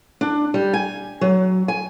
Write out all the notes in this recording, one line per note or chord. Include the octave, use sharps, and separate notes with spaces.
D4
G3
G#5
F#3
G#5